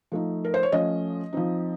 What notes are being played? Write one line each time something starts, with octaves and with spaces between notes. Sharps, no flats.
F3 A3 D#4
A#4
C5
C#5
F3 A3 C#4 D#5
F3 C4 D#4